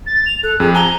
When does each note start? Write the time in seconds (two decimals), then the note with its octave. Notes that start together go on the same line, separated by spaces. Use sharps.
0.06 A6
0.26 F7
0.43 A4 F#6
0.60 F2 G#4
0.75 G#5 A#5 G7